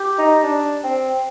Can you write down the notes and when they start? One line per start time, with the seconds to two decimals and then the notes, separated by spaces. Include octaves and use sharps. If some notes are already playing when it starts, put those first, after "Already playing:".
Already playing: G4
0.18 D#4
0.44 D4
0.84 C4